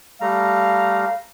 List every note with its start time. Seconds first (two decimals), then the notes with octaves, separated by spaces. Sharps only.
0.21 G3 A3 F5 A#5